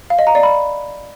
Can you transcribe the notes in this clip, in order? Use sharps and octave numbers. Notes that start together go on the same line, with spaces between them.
F5
D#5
A#5
D5
B5